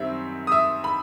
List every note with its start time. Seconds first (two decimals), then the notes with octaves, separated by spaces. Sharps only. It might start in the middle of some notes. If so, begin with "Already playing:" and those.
Already playing: F#2 D#3 G3 C4 E5
0.47 D#6
0.52 E5 E6
0.84 B5